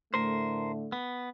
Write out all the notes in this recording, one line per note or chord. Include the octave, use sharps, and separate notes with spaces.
A2 D3 A3 A#4 C5
B3